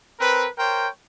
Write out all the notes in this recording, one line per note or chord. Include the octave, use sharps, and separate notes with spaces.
C4 A#4 B4
A#4 C5 C#5 G5